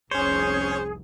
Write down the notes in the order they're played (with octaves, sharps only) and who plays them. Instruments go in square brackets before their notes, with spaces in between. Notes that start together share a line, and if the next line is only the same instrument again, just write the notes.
[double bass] F1 C2 [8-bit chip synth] C#4 C#5 [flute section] G#4 [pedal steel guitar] C5